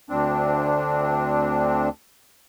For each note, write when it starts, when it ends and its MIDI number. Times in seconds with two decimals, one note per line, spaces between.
0.10 1.89 38
0.10 1.89 60
0.10 1.89 62